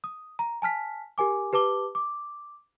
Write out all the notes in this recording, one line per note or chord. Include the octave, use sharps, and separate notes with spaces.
D#6
A#5
G#5 A5 F6 B6
G4 A#4 G#5 D6
G4 B4 A5 D6 G7
D6